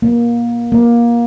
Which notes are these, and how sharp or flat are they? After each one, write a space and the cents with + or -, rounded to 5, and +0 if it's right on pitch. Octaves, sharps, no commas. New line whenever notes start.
A#3 +25
A#3 +20